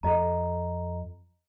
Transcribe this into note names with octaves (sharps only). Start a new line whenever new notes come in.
F2 A4 D#5 A#5